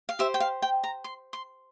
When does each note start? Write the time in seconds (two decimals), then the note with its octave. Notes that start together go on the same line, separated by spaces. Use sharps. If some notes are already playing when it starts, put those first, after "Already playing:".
0.09 F5
0.19 G4 C5 E5
0.34 G5
0.40 F5
0.62 G5
0.84 A#5
1.04 C6
1.33 C6